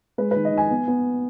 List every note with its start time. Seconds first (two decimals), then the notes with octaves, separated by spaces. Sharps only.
0.18 G#3 B4
0.31 D#3 B4
0.45 D#5
0.52 D#3
0.57 G#5
0.71 B3
0.88 B3